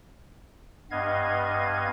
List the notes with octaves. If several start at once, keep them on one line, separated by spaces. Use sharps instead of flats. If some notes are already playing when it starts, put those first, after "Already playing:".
G2 B3 D#5 F5 G#6